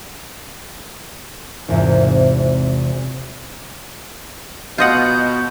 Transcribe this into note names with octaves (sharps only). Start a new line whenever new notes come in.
G#1 E2 C3 F4
B2 F4 D#5 F#5 G6